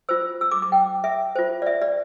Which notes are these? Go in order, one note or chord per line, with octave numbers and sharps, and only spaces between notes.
F4 C5 E6
E6
D6
D6
G5
E5
F4 C5
D5
E5
D5